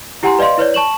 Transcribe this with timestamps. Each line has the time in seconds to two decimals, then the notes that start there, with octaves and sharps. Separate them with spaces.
0.23 E4 G4 F#5 G#5 A#5 C6
0.39 B4 D5 D#5 F5 C6
0.57 E4 B4 C#5 D5
0.74 A5 C#6 E7 F#7